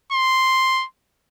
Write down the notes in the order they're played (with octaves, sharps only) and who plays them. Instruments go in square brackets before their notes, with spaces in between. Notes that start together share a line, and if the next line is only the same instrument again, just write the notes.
[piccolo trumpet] C6